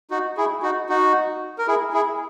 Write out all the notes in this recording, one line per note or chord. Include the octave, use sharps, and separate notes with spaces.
D#4 F#4
E4 G#4
D#4 F#4
D#4 F#4
A#4
E4 G#4
E4 G#4